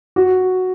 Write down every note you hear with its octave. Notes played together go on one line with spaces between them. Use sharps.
F#4